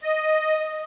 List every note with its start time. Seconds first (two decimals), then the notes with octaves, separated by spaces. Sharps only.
0.03 D#5